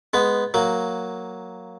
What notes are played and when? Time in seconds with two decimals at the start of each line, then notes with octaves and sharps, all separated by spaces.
0.14 G#3 B3
0.54 F#3 A#3